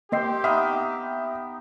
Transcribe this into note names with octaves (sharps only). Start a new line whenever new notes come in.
A#3 C4 G4 D#5 G5 C6 C7
B3 D#4 E5 D#6 F6